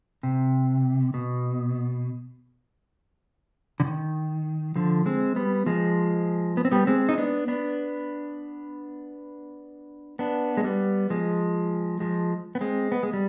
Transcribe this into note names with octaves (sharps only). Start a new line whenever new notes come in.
C3
B2
D3
D#3
D3 F3
G#3 C4
G3 B3
F3 G#3
B3
C4
G3 B3
G#3 C4
D#4
B3 D4
B3 D4
B3 D4
G#3
G3 B3
F3 G#3
F3 G#3
B3
G#3 C4
B3
G#3
G3